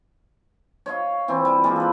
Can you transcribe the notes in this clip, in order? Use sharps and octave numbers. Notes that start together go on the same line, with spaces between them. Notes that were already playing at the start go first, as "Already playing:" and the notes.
C#5 D#5 F5
E3 C4
G3
G3 G#3 A#3 F4
A4 B4